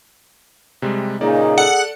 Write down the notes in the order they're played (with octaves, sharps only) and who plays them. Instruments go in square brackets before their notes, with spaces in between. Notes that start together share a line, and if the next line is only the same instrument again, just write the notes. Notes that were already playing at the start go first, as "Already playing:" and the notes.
[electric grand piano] C3 G3 G#3
[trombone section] A#2 C#3 D#4 [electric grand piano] A#3 D5 [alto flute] G#4
[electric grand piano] A4 D5 [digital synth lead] F#5